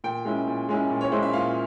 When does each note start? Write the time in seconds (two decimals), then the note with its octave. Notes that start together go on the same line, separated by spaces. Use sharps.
0.04 A#2 G5
0.25 G#3 C#4 E4
0.47 A#2
0.69 G#3 C#4 E4
0.90 A#2
1.01 C#5
1.12 G#3 C#4 E4 C5
1.23 E5
1.33 A#2 F5